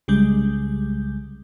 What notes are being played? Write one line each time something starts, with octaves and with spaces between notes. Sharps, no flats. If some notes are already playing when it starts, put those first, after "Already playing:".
C2 C#3 G3 G#3 G6